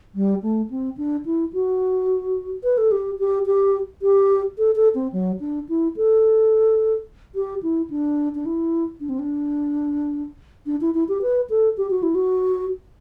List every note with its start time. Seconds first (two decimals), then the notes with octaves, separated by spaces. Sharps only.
0.15 G3
0.42 A3
0.70 C4
0.97 D4
1.25 E4
1.53 F#4
2.63 B4
2.78 A4
2.91 G4
3.19 G4
3.46 G4
4.02 G4
4.58 A4
4.75 A4
4.95 C4
5.12 F#3
5.40 D4
5.69 E4
5.97 A4
7.35 G4
7.63 E4
7.90 D4
8.35 D4
8.46 E4
9.00 D4
9.09 C4
9.19 D4
10.66 D4
10.81 E4
10.94 E4
11.08 G4
11.22 B4
11.50 A4
11.77 G4
11.90 F#4
12.03 E4
12.15 F#4